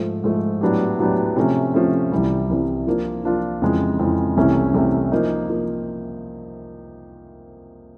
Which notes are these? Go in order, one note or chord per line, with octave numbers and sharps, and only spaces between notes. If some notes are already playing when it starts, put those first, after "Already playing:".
Already playing: G#2 F3 A3
G#2 F3 A3
A2 F#3 B3 D4 G4
A2 F#3 B3 D4 G4
C3 F3 A3 C#4
C3 F3 A3 C#4
C2 C3 E3 G3
C2 C3 E3 G3
F3 A#3 D4 F4
F3 A#3 D4 F4
F2 C#3 E3 G#3
F2 C#3 E3 G#3
C2 C3 E3 A3 C#4
C2 C3 E3 A3 C#4
F3 A#3 D#4
F3 A#3